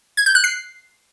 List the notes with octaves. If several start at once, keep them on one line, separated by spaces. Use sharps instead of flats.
G#6
G6
F#6
C7